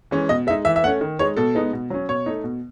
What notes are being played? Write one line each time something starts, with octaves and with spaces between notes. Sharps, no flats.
E3 G#3 C#4
B2 D#5
G#3 D#4 E5
E3 E5
E5
A3 C#4 F#5
D#3
G#3 D#4 C#5
B2 A4
G#3 B3 D#4
B2
F#3 C#4
B2 C#5
A3 D#4
B2